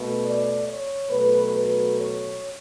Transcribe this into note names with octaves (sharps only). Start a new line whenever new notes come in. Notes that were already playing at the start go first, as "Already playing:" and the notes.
Already playing: B2 A3
D5
C#5
B2 F#3 A3 B4
B4
C#5